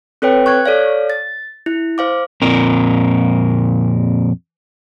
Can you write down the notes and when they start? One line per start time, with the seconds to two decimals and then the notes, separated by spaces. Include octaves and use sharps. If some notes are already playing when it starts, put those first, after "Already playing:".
0.22 C4 A4 B4 C#5 G5
0.46 C#6 F#6 G#6
0.66 A4 C#5 D5 F5
1.10 A6
1.66 E4
1.98 C5 F5 D6
2.42 F2 A#2 C4 A#4